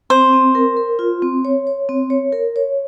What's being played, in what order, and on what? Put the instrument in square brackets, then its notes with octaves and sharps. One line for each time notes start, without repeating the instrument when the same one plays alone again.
[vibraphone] C4 [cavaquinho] C5
[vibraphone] C4
A#4
A#4
F4
C4
C#5
C#5
C4
C#5
A#4
C#5